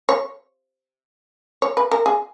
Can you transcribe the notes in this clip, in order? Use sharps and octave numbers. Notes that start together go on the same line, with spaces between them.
C#5
C#5
B4
A#4
G#4